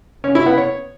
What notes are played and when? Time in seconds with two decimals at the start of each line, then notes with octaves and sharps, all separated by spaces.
0.24 C#4
0.35 E4
0.46 B3
0.58 C#5